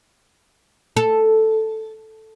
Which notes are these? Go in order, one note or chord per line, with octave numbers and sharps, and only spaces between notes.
A4